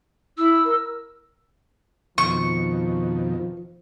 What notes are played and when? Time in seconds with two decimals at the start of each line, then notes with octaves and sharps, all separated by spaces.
0.38 E4 E6
0.65 A#4
2.18 F2 B2 D#3 F3 C#6